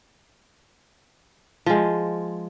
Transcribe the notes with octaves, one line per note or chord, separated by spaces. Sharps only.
F3 G#3